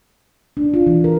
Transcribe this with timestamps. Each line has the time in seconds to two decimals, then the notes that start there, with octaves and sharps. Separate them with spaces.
0.57 D4
0.74 F4
0.87 E3
1.04 A#4